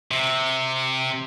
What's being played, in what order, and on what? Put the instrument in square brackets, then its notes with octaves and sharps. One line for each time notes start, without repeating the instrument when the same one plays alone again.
[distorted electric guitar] C3